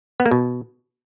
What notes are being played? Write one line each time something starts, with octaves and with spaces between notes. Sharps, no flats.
B3
A#3
B2